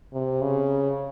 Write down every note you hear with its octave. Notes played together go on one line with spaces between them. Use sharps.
C3
C#3